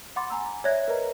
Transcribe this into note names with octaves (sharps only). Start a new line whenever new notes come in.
F#5 B5 C6 D6 A6
G#5 A#5 E6
C#5 D5 E5 F#6 G#6 A#6
A#4 B4 D5 D#5 A#5